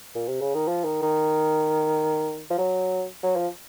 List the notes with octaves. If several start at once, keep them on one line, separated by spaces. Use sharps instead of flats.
A#2
C3
C#3
D#3
F3
D#3
D#3
F3
F#3
F#3
F3